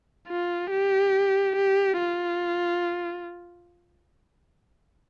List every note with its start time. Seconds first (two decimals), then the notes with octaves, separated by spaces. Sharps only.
0.29 F4
0.71 G4
1.56 G4
1.98 F4